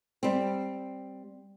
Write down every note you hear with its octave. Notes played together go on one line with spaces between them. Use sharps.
G3 C4